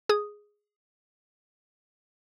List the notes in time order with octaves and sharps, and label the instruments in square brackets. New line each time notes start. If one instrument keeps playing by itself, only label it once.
[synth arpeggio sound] G#4 D#6